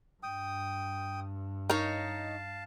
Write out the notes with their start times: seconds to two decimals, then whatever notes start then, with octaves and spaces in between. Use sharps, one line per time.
0.23 G2 G5 D#6
1.70 D#4 A#4 C#5 F5 A5 A#5